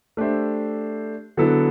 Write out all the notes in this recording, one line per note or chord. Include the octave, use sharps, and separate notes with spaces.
A3 D4 G4 C5 E5
D3 F#3 B3 E4 A4